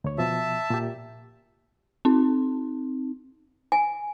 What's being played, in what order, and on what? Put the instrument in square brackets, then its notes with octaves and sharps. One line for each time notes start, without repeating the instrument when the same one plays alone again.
[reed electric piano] D2 C#5
[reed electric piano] B2 F3 [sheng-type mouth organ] E5 A5
[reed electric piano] A#2 G4
[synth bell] C4 D#4
[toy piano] G#5